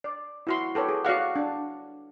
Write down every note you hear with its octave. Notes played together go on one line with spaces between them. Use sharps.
D5
E4 F#4 C6
G4 A4 B4 C#5
G#4
F#4 D5 F5 F#5
D4